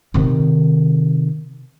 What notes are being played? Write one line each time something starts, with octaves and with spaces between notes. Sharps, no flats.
C3 D#3